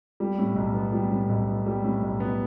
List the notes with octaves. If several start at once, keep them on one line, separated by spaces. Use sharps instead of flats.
G3
A2
B1
B3
G3
A2
B1
B3
G3
A2
B1
B3